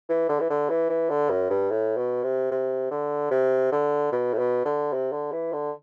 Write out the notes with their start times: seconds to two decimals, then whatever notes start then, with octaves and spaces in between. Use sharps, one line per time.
0.09 E3
0.29 D3
0.40 E3
0.50 D3
0.69 E3
0.90 E3
1.10 D3
1.30 F#2
1.50 G2
1.70 A2
1.97 B2
2.23 C3
2.51 C3
2.91 D3
3.31 C3
3.72 D3
4.12 B2
4.34 A2
4.38 B2
4.65 D3
4.93 C3
5.12 D3
5.32 E3
5.53 D3